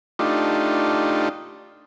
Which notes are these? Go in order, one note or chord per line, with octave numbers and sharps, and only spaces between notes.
A3 D4 D#4 F4 G4